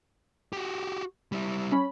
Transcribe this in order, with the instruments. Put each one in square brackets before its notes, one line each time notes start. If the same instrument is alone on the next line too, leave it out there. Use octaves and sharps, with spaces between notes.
[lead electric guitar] F#4 G4
G3 E4
[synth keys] C#4 B5